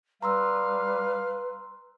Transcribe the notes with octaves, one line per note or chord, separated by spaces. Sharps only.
G3 B4 F5 A#5 C6 E6